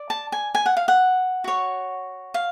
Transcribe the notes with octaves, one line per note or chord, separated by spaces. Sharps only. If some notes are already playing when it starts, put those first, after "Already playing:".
Already playing: D5
A5
G#5
G#5
F#5
F5
F#5
F#4 C#5
F5